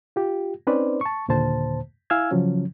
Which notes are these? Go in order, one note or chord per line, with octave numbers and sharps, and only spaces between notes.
F4 G4
C4 C#4 D#4 B4 C5 D5
A5 C#6
D#2 A#2 D3 C5 A5
E4 F5 G#5 E6 F6 G#6
C#3 F3 F#3 C#4